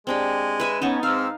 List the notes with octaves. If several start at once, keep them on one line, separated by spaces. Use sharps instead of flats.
G#3 C4 D4 G4
B4 E5 G#5
B3 C#4 D#4 A5 C#6
G#2 C4 F5 E6 F6